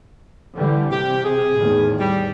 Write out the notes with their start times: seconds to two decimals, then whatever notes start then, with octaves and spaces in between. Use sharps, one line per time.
0.56 D3 E3 G3
0.91 C3 G4
1.24 G#4
1.57 E2 A2 D#3
1.98 G3